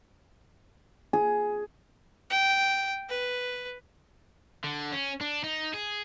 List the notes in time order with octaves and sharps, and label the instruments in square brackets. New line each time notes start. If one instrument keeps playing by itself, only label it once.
[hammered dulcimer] G#4
[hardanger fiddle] G5
B4
[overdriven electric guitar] D3
C#4
D4
D#4
G#4